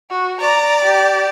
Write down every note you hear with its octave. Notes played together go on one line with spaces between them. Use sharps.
F#4
D5 A#5
G4